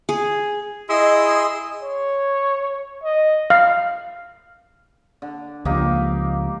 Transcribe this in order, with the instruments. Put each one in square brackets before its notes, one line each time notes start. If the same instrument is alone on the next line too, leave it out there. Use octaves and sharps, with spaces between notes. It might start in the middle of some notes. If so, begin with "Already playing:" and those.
[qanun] G#4
[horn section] E4 D#5 [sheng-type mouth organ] G#4 C6 E6
[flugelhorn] C#5
D#5
[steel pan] F5
[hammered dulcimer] D3
[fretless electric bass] C#2 F3 [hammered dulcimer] A#3 D#4 G4